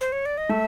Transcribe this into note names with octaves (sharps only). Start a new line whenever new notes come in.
C5
C#5
D5
D#5
A3 E5